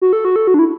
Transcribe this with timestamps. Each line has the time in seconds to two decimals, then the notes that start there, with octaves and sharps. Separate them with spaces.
0.02 F#4
0.13 A4
0.25 F#4
0.36 A4
0.47 F#4
0.54 D4
0.59 E4